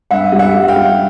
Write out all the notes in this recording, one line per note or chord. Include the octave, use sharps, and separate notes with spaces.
G2 E5 F#5
G3
E5 F#5
G3
F5 G5
G3